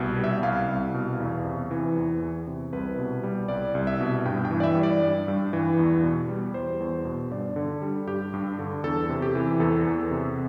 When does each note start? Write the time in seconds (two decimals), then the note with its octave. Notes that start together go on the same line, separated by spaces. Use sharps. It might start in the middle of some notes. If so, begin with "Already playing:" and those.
Already playing: C2 B2
0.18 G3
0.24 E5
0.43 C2 F5
0.69 C2
0.94 B2
1.20 E2
1.45 C3
1.71 E3
1.96 E2
2.22 E2
2.47 C3
2.73 C2 B4
2.98 B2
3.24 G3
3.48 C2 D5
3.75 C2
3.87 E5
4.01 B2
4.25 G2 G5
4.45 G5
4.51 E3
4.60 D5
4.64 E5
4.76 G3
4.83 D5
5.02 G2
5.28 G2
5.53 E3
5.79 E2
6.03 B2
6.29 G3
6.54 E2 C5
6.80 E2
7.05 B2
7.31 G2 D5
7.56 D3
7.82 G3
8.07 G2 G4
8.34 G2
8.59 D3
8.84 E2 A4
9.09 C3
9.22 G4
9.35 E3
9.60 E2 A4
9.86 E2
10.11 C3